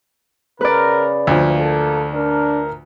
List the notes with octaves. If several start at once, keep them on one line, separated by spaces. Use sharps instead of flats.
C#3 A#4 B4 D5
D2 F3 A#3
A4
D4 A#4